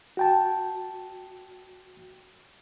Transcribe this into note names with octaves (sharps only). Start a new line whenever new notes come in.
F#4 G5 A5